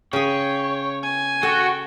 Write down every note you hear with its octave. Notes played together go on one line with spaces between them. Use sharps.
C#3 G#4 C#5 G5
G#5
F#4 A4 G5